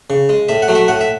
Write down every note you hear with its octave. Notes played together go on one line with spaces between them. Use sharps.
C#3
G#3
A2 E5
F#5
F#3 A3
E5
A2 F#5
E5